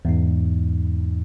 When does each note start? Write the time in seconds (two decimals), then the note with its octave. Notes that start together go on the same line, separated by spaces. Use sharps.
0.05 E2 G#2 D#4